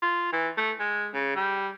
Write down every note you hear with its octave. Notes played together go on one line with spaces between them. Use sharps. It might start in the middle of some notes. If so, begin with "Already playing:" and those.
F4
E3
A3
G#3
C#3
G3